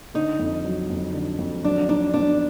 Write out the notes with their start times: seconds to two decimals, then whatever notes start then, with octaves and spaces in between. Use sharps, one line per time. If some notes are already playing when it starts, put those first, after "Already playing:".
0.14 D3 D#4
0.39 F2
0.65 F#3
0.90 F2
1.14 D3
1.39 F2
1.64 F#3 D4
1.88 D4 D#4
2.14 B3 D4